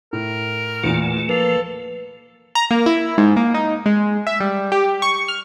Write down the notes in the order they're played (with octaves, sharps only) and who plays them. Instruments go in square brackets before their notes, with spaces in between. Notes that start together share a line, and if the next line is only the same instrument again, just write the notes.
[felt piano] A2 [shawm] A#4
[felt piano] E2 A#2 [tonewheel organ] A3
[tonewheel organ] F3 [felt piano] A#3 [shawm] A4 [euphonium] B4
[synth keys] A#5
A#3
E4
G#2
A#3
D#4
G#3
E5
G3
G4
C#6
F6